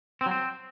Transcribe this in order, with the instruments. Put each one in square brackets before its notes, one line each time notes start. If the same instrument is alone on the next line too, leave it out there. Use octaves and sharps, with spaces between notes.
[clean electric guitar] C4
F#3
C4